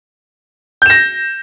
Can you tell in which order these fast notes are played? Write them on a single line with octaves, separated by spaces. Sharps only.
G6 E7 A#6